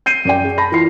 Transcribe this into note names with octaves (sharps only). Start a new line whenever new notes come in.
G6 C7 D#7
F#2 D5 G5
G#4
A5 B5 A#6
E3 F4 C7